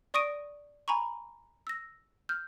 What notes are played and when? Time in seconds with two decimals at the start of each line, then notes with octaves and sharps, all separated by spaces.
0.14 D5 C#6 D#6 A#6 D7 D#7
0.88 G#5 A#5 B5 C#6
1.67 E6 A#6
2.29 F6 G6